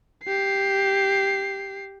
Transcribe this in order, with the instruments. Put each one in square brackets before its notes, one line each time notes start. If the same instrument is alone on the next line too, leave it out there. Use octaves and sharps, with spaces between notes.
[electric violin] G4 C7